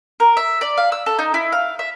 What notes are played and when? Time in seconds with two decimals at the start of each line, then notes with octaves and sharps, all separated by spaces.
0.20 A#4
0.37 E5
0.61 D5
0.77 F5
0.92 E6
1.06 A4
1.19 D#4
1.34 E4
1.52 F5
1.79 E5